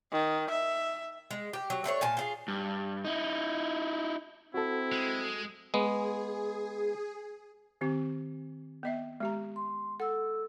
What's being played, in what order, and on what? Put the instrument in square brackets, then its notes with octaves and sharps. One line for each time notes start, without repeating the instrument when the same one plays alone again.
[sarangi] D#3
E5
[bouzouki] G#3
G4
F#3
A3 D4 G4 C#5
A#2 G#5 A5
F4 G#4
[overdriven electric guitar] G2
D#4 E4
[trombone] C4 [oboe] E4 [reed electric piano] F#4 A4
[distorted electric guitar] G#3
[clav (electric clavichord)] G#3 B3 [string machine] G#4
[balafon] D#3 C4 G4
B3 D#5 E5
G#3 G4 A#5
[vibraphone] C6
[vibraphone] A4 E6 [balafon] F#5